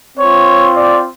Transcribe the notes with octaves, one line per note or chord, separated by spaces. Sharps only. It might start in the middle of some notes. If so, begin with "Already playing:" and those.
C4 F4 C#5
D5